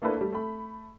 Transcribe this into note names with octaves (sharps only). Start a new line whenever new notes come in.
A3 A#3 D4 E4 A4 B4
G3 A3
A3 B5